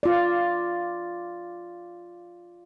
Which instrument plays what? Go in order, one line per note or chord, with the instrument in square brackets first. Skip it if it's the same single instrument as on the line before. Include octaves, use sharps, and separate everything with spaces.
[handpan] F4 D5